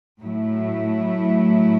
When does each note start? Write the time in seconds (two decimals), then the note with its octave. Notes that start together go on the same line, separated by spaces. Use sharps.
0.22 A2 F#3 A3 E4